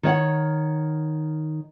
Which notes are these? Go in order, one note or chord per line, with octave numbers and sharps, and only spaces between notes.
D#3 C#5 F#5